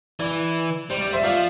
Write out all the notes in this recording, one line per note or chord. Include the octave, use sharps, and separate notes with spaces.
E3 D5
G3 C5
D5
C5 E5
F3 D5 F5